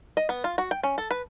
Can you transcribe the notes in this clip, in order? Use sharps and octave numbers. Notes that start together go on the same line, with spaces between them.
D#5
B3
F4
F#4
G5
C#4
A4
B4